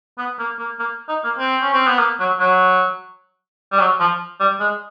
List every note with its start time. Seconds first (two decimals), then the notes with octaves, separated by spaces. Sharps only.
0.18 B3
0.39 A#3
0.59 A#3
0.80 A#3
1.09 D#4
1.24 A#3
1.39 C4
1.62 C#4
1.74 C4
1.87 B3
1.99 A#3
2.20 F#3
2.39 F#3
3.72 G3
3.79 F#3
4.00 F3
4.40 G3
4.60 G#3